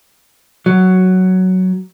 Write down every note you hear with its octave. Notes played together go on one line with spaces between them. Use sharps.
F#3